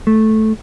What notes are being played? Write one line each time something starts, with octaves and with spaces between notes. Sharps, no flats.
A3